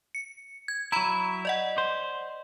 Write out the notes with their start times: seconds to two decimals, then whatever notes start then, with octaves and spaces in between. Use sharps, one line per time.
0.15 C#7
0.68 G#6
0.92 F#3 E4 A#5 B5
1.45 D5 D#5 F#5
1.78 C5